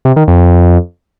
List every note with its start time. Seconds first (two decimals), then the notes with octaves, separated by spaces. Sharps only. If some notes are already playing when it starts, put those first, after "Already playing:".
0.05 C3
0.16 D#3
0.28 F2